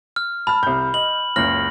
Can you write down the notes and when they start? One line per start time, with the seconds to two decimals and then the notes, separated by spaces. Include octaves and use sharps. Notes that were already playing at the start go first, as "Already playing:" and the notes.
0.16 F6
0.47 A5 B5 F6
0.63 C2 G6
0.94 D#5 F#7
1.36 F#1 C#2 F6 A#6 F#7